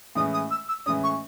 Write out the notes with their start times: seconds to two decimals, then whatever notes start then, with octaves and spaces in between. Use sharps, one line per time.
0.15 A2 E3 G#3 C#4 D#6
0.33 D#6
0.51 E6
0.68 E6
0.86 A2 E3 G#3 C#4 D#6
1.03 C#6